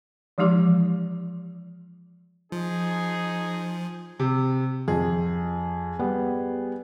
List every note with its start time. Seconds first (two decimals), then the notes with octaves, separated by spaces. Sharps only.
0.38 E3 F3 G#3 D#4 G4 D6
2.52 F3 D#4 G#4
4.19 C3
4.88 F2 G#4
5.99 G3 B3